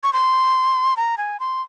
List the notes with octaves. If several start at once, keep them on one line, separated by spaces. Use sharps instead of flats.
C#6
C6
A#5
G#5
C6